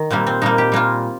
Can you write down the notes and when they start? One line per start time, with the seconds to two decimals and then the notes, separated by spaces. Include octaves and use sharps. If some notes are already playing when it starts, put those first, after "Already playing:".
Already playing: D#3
0.10 A#2 G3 A#3 C4
0.27 C4
0.42 A#2 G3 A#3 D#4
0.58 G4
0.72 A#2 G3 A#3 F4